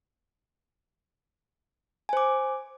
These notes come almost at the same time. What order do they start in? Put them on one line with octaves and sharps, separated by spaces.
G#5 C5 D6